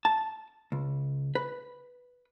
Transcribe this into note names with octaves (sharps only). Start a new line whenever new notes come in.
A5
C#2
B4